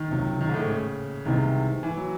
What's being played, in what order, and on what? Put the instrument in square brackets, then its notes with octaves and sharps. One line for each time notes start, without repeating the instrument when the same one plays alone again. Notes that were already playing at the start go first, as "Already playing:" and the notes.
Already playing: [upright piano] D#3
[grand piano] C#2 C3 F#3
[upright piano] D#3
G#2
A2
C#3
[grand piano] C2 C3 E3 G#3 [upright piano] D#3
[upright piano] E3
F#3